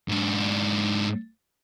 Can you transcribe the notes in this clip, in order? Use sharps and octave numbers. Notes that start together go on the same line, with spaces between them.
G#2 D4